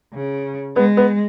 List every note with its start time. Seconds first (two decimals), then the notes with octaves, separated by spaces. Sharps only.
0.14 C#3
0.76 G#3 B3
0.97 B3